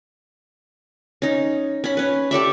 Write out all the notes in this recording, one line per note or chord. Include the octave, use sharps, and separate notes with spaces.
C#4 D#4
C#4 B5
C#4 B4
G4 A4 D5 E5